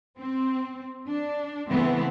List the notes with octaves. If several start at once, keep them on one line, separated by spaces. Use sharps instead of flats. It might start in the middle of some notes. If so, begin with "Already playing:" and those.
C4
D4
C#3 E3 A3 B3 C4